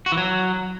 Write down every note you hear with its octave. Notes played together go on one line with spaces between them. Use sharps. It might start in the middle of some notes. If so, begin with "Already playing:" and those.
F#4
E3
F#3